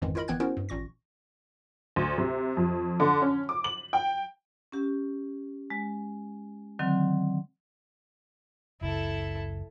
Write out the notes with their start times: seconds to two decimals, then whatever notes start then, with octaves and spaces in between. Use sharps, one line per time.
0.02 A1 F2 G#2 D#3 E3 G#3
0.15 E4 F4 A#4 D#5 B5
0.28 G1 E3 B3 G5 F#6 G#6
0.40 B3 C#4 E4 F#4 A#4 C5
0.57 G2
0.69 A1 A#2 C#6 A#6
1.96 D2
2.18 C3
2.57 F2
3.00 D3
3.22 C#4
3.49 D6
3.64 F#7
3.93 G5
4.72 C#4 G4
5.70 G#3
6.79 D3 D#3 F#3 C4
8.81 F#1 C#2 E4 A4